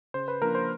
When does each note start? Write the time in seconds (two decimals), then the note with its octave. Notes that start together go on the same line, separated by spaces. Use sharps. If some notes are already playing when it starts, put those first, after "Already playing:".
0.14 C#3 C5
0.28 B4
0.42 F3 A#3 D4 A#4
0.55 C5